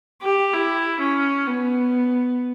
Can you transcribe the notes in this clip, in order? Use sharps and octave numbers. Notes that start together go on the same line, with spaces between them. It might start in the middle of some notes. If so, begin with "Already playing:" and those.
G4
E4
C#4
B3